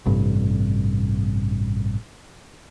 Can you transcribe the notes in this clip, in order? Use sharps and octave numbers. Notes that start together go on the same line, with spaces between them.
A1 G2 C3